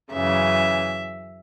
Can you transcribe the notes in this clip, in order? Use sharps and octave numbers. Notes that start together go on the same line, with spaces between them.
F#2 C#3 E3 E5